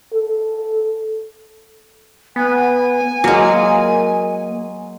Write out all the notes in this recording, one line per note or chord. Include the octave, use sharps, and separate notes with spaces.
A4
B3 G#5
F#3 G#3 A#3